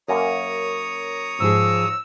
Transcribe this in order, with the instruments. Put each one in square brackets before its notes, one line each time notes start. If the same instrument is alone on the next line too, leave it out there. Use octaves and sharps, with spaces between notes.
[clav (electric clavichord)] F#2 A#3 C#4 [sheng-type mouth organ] C#5 A#5 D#6
[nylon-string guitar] G#2 F3 G#4 [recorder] E6